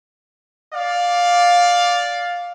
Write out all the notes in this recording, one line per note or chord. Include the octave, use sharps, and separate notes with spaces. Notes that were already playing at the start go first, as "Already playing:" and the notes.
D5 F5